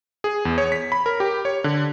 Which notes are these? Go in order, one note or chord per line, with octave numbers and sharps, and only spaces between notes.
G#4
E2
C#5
B6
B5
A#4
G4
C#5
D3